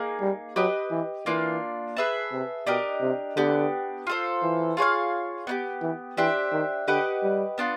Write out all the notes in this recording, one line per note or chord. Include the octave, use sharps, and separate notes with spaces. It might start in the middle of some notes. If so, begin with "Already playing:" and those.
Already playing: A#3 D#4 G#4
G3
F#3 G4 B4 D#5
E3
E3 A#3 D4 F4
G#4 B4 E5 A5
C3
B2 D4 G4 A#4 D#5
C3
D3 B3 D4 G4
F4 A4 C5
E3
F4 G#4 C#5 F5
B3 D#4 G4
E3
E3 D4 G4 C5 E5
D#3
D3 G4 B4 D#5 F#5
G3
B3 D4 F4